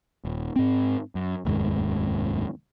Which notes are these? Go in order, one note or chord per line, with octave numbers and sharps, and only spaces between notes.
D#1
G#2 C4
F#2
F1 D#2 G#2